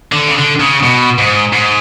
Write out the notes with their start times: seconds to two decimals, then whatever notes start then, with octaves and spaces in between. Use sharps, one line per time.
0.12 D3
0.28 C#3
0.36 D3
0.60 C#3
0.83 B2
1.18 G#2
1.53 G#2